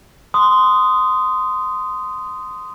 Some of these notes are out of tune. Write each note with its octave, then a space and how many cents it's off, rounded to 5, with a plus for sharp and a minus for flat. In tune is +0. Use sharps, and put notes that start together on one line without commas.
C6 -15 D#6 +0